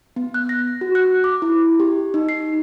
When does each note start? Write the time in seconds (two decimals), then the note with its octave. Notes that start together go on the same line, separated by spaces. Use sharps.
0.16 B3
0.34 F#6
0.49 A#6
0.81 F#4
0.95 F#6
1.24 D6
1.42 E4
1.80 G4
2.14 D#4
2.29 C7